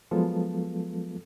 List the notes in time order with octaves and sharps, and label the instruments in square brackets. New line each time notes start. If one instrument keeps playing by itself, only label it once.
[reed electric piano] F3 F#3 G#3 B3 F4 A4